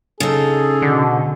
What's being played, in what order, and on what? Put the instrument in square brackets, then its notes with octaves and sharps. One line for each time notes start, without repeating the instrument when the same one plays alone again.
[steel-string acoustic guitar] C#3 D#4 [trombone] G#4 [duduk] A4
[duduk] B2 [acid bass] D3